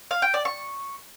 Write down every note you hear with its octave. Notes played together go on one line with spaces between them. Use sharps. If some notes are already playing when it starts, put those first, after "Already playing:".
F5
G5
D5
C#6